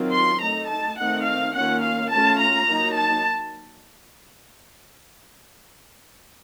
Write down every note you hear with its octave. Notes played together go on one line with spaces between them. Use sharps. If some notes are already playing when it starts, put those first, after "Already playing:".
Already playing: D#3 F#3 C4 F4
C6
A3 D#4 A#5
A5
D#3 A3 C4 D#4 F#5
F5
D#3 A#3 C#4 F4 F#5
F5
A3 C#4 F4 A5
A#5
F#3 A#3 D#4
A5